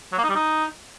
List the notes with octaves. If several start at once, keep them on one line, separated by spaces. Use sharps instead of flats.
F#3
A#3
D#4
G3
D#4